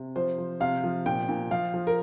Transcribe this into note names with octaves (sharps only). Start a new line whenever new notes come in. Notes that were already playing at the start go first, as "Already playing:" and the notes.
Already playing: C3
F3 C5
F3
C3 F5
F3
A#2 G5
A#2
F3 F5
F3
A#4